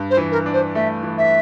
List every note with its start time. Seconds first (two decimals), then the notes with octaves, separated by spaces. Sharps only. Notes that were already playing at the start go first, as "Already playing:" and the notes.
Already playing: G2
0.10 C5
0.17 E3
0.31 A#4
0.46 D4
0.53 C5
0.75 A3 E5
1.03 E3
1.18 E5